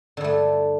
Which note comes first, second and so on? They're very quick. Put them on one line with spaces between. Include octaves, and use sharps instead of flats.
D3 G2 A3